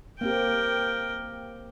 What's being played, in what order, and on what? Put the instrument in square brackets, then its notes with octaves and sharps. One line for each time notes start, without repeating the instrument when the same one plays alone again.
[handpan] A#3 C4 G4 [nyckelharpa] A#4 G5